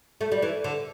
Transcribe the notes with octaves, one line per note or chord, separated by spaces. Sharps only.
A3
G3
E3
D3